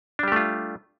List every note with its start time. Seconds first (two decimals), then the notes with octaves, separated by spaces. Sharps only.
0.19 D4
0.23 G3
0.28 G4
0.32 A3
0.36 F4